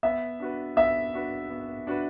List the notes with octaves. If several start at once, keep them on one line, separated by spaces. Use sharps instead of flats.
B3 E5
D4 F#4 B4
B3 E5
D4 F#4 B4
B3
D4 F#4 B4